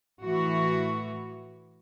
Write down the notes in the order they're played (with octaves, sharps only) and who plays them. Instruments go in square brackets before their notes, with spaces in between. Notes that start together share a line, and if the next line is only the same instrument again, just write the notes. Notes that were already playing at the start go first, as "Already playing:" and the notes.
[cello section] A2 E3 F#4